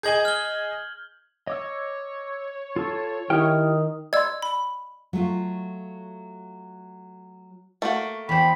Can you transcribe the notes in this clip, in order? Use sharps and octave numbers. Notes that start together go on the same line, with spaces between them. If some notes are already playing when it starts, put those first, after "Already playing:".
G#4 D#5 G#5 G6 G#6 F#7
F6 G7
C#5 D#5 D6 E6
F4 A4 A5
D#3 E4 G4 G5 D#6 F6
D5 D#5 C6 E6 G#6
B5
F#3 A3 F4
A3 A#3 F#4
E2 C5 G5 B5